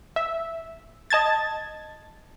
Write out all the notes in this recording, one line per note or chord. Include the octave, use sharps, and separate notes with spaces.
E5
D#5 A5 G#6 A6